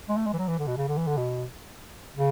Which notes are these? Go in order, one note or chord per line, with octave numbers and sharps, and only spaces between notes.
G#3
A3
G#3
E3
F#3
E3
D3
B2
C#3
D3
E3
D3
B2
C#3